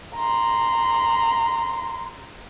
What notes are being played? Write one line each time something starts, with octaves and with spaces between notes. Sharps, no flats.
A#5 C6